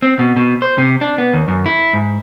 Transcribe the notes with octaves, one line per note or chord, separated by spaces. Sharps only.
C4
B2
B2
C5
C3
D4
B3
D#2
F#2
E4
G#2